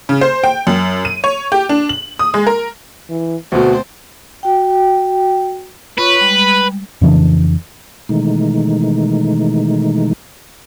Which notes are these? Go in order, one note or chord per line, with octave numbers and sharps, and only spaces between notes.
C#3
C5
G5
F#2
D#7
C#5
G4
D4
F#7
D#6
G#3
A#4
E3
D2 B2 A3 C4 F#4 C5
F#4 G5
F4 B4 C#5 C#6
G3 G#3
F2 C#3 E3 D4
B2 D#3 E3 G#3 A3 D#4